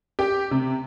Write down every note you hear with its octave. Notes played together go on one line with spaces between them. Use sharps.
G4
C3